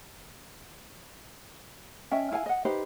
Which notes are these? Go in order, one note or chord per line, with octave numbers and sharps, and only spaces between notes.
C#4 D#5 E5 G5
E4 F5 F#5 G#5
D#5 F#5
D#4 G4 B4 C5